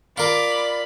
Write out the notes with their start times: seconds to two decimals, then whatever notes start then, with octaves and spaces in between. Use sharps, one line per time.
0.18 F4 A#4 D5 B5 D6